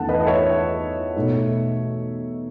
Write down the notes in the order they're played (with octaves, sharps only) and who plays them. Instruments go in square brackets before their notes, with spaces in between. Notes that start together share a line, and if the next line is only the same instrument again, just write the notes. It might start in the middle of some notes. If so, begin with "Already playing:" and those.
Already playing: [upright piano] E2 D#3 A3 C#4 F#5 A5
B4 D#5
D#5
C#5 E5
B2 A3 D#4